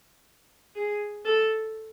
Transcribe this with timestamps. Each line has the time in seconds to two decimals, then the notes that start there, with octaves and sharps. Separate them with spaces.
0.75 G#4
1.25 A4